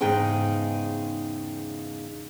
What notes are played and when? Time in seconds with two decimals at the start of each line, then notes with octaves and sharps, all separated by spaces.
0.01 E2 G#2 C#3 D#4 G#4 G5